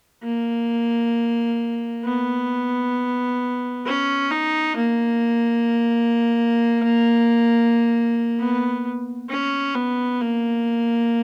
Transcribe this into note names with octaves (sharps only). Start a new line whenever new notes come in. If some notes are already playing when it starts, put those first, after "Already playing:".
A#3
B3
C#4
D#4
A#3
B3
C#4
B3
A#3